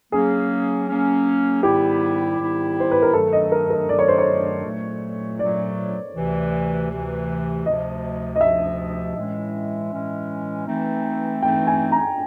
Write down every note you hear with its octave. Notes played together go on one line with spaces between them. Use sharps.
F#3 A#3 C#4 G#4
F#3 A#3 C#4
G#2 D#3 G3 B3 E4 G4
G#2 D#3 G3 B3 E4
C5
B4
A#4
G2 D#3 F#3 A3 A4
D#5
A#4
A#4
G2 D#3 F#3 A3 D5
C#5
C5
C#5
A#2 F#3 A3
A#2 F#3 A3 D5
D2 C3 E3
D2 C3 E3
D2 C3 F3 D#5
D#5
D2 C3 F3 E5
A2 E3 G#3 C#4
A2 E3 G#3 C#4
E3 A3 C4 D#4
E3 A3 C4 D#4 G5
G#5
A#5